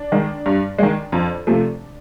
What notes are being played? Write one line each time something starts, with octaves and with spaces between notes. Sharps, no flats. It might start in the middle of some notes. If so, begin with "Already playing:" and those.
Already playing: D4
D#3 G#3
G2
D#3 G#3
F2
C3 F3 A3